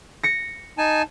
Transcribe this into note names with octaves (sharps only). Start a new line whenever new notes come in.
A#6 C#7
D#4 G#5 A5